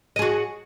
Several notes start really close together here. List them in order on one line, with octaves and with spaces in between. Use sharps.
D#5 G#4 F#4